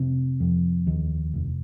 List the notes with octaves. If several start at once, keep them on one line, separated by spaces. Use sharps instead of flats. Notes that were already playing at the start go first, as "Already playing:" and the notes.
Already playing: F1 C3
F2
D#2
F1